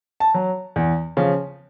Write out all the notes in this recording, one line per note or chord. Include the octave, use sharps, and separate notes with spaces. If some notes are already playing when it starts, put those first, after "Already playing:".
A5
F#3
E2
C#3 F3